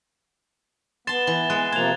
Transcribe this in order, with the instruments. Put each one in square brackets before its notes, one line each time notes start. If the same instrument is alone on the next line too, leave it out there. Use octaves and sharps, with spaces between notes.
[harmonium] B3 [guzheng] A5 C6 [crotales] A6 E7 G7
[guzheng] E3
[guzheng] G#3 [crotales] F#6
[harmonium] C3 F3 A#3 [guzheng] A5 [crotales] G#6 F7